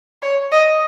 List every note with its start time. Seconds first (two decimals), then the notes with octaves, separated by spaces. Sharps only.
0.22 C#5
0.52 D#5